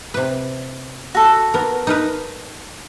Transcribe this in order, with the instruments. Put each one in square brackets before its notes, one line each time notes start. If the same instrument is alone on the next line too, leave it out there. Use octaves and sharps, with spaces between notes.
[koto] C3 B4
[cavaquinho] F#4 A4
[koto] B3 A#4
D#4 A#4 B4